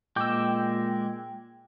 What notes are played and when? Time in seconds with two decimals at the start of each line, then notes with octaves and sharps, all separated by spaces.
0.16 A#2 G#3 G5 D6 E6